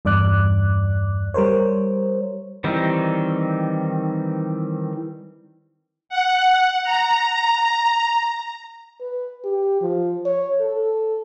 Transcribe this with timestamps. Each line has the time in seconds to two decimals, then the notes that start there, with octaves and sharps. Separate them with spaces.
0.05 E2 G2 D5 D6 F#6
1.34 G3 A#4 C5 C#5
2.64 D#3 E3 G3 C4 D#4
6.09 F#5
6.84 A#5
9.01 B4
9.45 G4
9.82 F3
10.26 C#5
10.60 A4